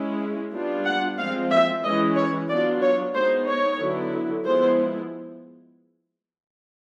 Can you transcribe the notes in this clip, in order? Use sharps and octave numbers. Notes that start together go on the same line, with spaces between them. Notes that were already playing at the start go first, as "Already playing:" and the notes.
Already playing: G#3 C#4 E4
G3 B3 D4 F4
F#5
F3 G#3 C4 F4 F5
E5
E3 G#3 C#4 E4 D#5
C#5
F#3 B3 D4 F4 D5
C#5
G#3 B3 D#4 C5
C#5
D3 F#3 B3 E4
F3 G#3 B3 E4 C5